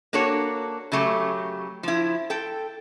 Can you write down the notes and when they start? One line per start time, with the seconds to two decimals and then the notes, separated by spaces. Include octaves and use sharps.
0.13 A#3 D4 F#4 A4 C#5
0.92 C#3 F#3 A3 G4
1.83 F3 E4
2.30 A4 G5